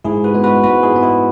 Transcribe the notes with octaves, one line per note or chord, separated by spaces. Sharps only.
G#2 E4 G#4
F#4 B4
G#3 B3
F#4 B4
G#2 F#4 B4
E4 G#4
G#3 B3
E4